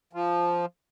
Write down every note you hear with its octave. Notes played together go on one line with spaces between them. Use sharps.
F3